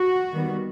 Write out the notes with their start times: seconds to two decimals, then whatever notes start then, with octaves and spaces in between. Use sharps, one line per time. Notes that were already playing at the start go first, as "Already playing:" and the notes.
Already playing: F#4
0.32 D#3 G3 B3